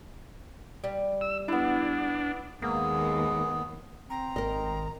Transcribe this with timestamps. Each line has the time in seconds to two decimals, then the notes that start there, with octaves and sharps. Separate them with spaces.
0.84 G3
1.21 E6
1.48 B3 D4 E4
2.62 D#2 G#3 A#3 B3 G#4
4.10 C4 A#5
4.36 G#1 A#4 D#5